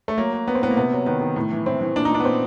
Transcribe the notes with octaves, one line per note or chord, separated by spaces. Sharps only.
A3
F#3 A#3
F#3
F#3 B3
C4
A2 B3
A#3
C3 B3
F#3
D#3 B3
D#3
A2
E3
E3 C4
E3
A#2 D4
D#4
A#2 D4
B3
A#2 C4